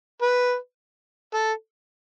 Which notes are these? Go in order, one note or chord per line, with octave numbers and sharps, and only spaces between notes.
B4
A4